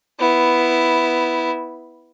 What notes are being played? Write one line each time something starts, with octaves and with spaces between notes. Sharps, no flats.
B3 E4